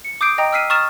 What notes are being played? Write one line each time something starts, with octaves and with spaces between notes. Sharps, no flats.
C#7
D6 D#6 G6 C7 D7
D#5 G5 A#5 D#6
E6 F6 B6 C7 D#7
A#5 C#6 D#6 F6 A6 E7